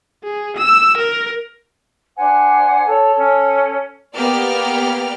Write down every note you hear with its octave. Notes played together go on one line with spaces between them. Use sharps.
G#4
E6
A#4
D4 C5 F#5 G#5
A4 C#5
C#4 A4
A#3 B3 G4 D5 G5 F6